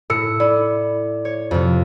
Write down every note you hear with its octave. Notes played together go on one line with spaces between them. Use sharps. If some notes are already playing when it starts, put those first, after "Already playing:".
A2 A4 E6 C#7
E4 D5
C#5
F2 C3